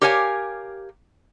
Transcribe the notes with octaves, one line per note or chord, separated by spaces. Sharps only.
G4 A#4 C#5 F5 G#5